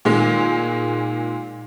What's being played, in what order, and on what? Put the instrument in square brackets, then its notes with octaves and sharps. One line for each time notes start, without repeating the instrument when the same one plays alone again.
[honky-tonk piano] A#2 D#3 G#3